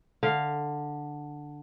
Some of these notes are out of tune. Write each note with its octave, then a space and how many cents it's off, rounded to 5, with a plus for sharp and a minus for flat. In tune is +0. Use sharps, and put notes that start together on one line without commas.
D3 +5 F5 +0